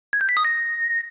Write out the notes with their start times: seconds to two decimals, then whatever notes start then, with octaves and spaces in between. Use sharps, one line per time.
0.13 G#6
0.21 G6
0.29 B6
0.37 D#6
0.45 A#6